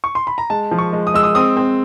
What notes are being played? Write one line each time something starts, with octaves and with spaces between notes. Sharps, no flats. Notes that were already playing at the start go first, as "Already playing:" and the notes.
C#6
C6
B5
A#5
G#3 A5
F3
C#6
G#3
D#6
G#3 E6
D#6
C4 D#6
C4